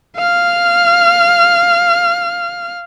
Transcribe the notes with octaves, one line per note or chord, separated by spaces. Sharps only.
F5 F6